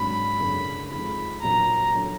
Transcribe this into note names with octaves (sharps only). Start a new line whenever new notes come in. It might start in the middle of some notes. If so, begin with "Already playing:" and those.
Already playing: G#1 G#2 F#3 D4 B5
F#1 F#2 D3 G#3 D4
F2 F3 G#3 D#4 B5
A#1 A#2 F#3 A#3 A#5
D3 F#3